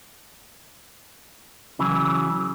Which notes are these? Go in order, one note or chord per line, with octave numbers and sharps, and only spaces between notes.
C#3 E3 F#3